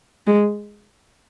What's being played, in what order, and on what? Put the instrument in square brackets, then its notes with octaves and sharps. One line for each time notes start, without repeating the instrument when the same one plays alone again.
[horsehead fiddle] G#3